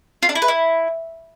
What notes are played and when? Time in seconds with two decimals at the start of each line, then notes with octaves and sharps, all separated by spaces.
0.23 F4
0.29 D4
0.35 E4
0.42 B4
0.48 E4